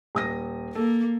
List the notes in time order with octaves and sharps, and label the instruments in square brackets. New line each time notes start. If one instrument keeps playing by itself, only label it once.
[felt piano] D#1 D#6 A#6
[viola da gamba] A#3 [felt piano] A4